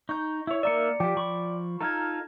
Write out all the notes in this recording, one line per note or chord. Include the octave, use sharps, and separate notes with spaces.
D#4 C#6 G6
E4 C#5
A#3 D#4 D5 E5 A#5 C#7
F3 G4 D5 G5 D6
F3 B5 C#6
D#4 F4 A4 A#5 F6 G#6